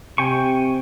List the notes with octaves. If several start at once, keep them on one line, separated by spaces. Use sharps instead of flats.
C3 G5 G#5 C#6